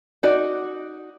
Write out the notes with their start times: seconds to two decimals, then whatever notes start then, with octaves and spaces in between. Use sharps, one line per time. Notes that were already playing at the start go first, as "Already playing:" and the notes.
0.23 D#4 F#4 D5